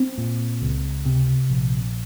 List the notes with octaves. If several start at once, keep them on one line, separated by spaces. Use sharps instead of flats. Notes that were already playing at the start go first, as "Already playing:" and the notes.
Already playing: C4
A#2
C#2
C3
A#1